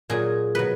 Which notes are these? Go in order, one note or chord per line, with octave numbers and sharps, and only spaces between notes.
A#2 F#3 G#4
B2 F#3 B4